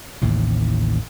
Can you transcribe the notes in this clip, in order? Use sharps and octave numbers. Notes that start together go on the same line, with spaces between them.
A1 D#2 A2 C3